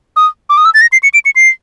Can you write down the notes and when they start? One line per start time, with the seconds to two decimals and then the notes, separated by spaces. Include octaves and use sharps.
0.16 D#6
0.49 D6
0.57 D#6
0.65 E6
0.74 A6
0.81 A#6
0.92 C7
1.03 C#7
1.14 D7
1.25 C#7
1.36 C7